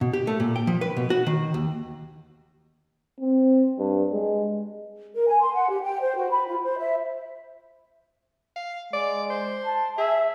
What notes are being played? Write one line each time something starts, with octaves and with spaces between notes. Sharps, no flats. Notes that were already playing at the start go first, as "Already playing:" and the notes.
B2
G4
A3
A#2
G5
F3
B4
B2
F#4
D#3
D#2
C4
G2
G#3
A#4
G#5
C6
F#5
G4
G5
C5
F#4
B5
F4
C5
E5
F5
G#3 D5
C5
A5
G#4 E5